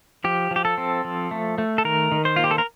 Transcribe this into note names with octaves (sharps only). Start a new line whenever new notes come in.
F3 G4
F3
G4
A4
C4
F3
A3
A3
A4
D#3 A#4
D#3
C5
A#3 F4
G4
A4
A#4